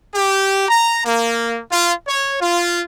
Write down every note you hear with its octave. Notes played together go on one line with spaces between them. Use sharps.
G4
A#5
A#3
F4
C#5
F4